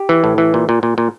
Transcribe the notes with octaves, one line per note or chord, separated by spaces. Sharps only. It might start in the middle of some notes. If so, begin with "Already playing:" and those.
Already playing: G4
E3
A2
E3
A#2
A#2
A#2
A#2